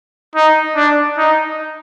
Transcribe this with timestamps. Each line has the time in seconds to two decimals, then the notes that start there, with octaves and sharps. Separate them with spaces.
0.36 D#4
0.76 D4
1.18 D#4